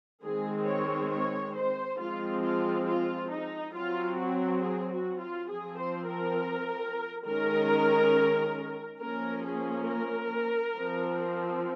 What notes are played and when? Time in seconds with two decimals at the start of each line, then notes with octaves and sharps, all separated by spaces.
0.24 D#3 G#3 C4 G#4
0.68 C#5
1.12 C#5
1.55 C5
2.00 F3 G#3 C4 F4
2.43 F4
2.87 F4
3.31 D#4
3.75 F#3 C4 F4
4.18 F#4
4.62 G#4
4.92 F#4
5.21 F4
5.50 F3 C4 G#4
5.79 C5
6.08 A#4
7.25 D#3 G#3 C#4 A#4
9.01 F3 A#3 C#4 A#4
9.45 G#4
9.88 A#4
10.77 F3 C4